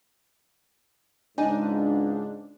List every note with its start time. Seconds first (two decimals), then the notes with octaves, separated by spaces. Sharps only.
1.38 C#2 G#2 D4 D#4 G#5